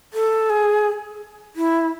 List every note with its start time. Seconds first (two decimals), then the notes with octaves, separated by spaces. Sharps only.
0.13 A4
0.50 G#4
1.56 E4